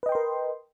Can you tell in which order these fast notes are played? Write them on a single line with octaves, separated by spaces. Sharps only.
B4 D#5 G5 C6 A#4